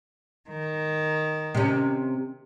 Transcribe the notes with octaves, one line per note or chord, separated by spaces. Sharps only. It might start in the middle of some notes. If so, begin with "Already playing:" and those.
D#3
C3 C#4